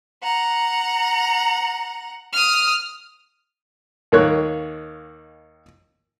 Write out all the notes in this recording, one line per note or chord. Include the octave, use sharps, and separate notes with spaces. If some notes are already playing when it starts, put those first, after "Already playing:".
F#5 A#5
D#6 F6
D#2 D#3 A#3 C#5 F#6